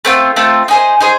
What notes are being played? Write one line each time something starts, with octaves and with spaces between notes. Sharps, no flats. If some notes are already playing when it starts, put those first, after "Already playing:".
A3 C4 F4
A3 C4 F4
D#4 G#4 C5
D#4 G#4 C5